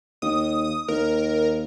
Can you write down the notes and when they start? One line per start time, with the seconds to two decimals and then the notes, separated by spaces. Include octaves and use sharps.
0.22 D#2 D#6
0.88 D#2 A#4